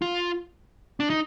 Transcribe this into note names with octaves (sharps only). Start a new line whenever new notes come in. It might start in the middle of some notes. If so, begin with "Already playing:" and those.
F4
D4
D#4